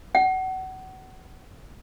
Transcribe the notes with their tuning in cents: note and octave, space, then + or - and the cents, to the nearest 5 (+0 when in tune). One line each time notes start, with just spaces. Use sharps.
F#5 +30